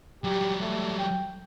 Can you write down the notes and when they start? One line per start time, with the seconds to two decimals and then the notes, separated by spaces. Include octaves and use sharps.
0.24 F#3 G3 G4
0.60 A3
0.98 G5